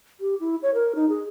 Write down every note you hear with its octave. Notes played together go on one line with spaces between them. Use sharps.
G4
E4
C#5
A#4
D#4
G#4